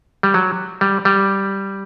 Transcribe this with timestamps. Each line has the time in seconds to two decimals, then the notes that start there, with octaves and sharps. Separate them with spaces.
0.23 G3
0.34 F#3
0.81 G3
1.05 G3